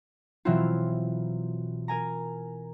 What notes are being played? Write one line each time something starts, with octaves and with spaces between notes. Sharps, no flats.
B2 E3 F#3 C4 E4 F4
A#4 G#5 A#5